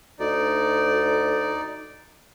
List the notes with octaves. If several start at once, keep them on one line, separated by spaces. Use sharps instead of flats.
D2 D#4 D5